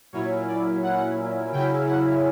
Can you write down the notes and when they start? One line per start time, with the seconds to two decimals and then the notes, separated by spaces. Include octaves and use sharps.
0.13 A#2 F#3 C#4 E4 C#5
0.47 D5
0.83 F#5
1.52 C#3 F#3 C#4 E4 G5
1.87 F#5